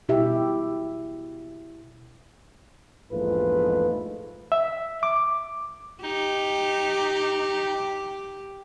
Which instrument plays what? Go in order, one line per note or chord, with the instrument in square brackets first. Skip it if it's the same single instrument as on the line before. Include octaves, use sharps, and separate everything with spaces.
[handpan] B2 E4 G4 E5
[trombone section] A#1 E2 G#2 A3 F4 B4
[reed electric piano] E5
D6
[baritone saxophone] D#4 [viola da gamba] G4